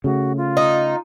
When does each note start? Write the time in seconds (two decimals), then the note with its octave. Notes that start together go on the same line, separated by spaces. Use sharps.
0.04 C#3 A3 F#4
0.37 F4
0.57 D#4